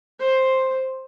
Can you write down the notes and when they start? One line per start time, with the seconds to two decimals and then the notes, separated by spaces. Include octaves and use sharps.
0.19 C5